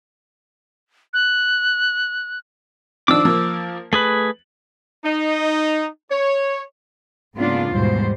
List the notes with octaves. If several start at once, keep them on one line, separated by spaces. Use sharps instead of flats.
F#6
D#3 F3 D4 D6 E6
F3 A#3
A3 G#4 B4 F#7
D#4
C#5
G#2 C#3 A#3 B3 D4 F4
D#2 G#2 B2 E3 G3 C5